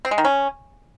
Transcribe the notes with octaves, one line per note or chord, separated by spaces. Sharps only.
C4
G#3
D#3
C#4